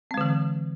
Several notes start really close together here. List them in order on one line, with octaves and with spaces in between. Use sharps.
C4 G#3 D3 E3